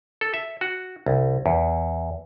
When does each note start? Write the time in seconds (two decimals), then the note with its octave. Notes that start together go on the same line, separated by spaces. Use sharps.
0.21 A4
0.34 E5
0.61 F#4
1.06 C2
1.46 E2